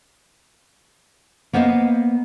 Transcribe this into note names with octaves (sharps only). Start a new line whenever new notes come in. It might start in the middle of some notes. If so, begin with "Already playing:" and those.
A#3 B3 C5 D#5 F5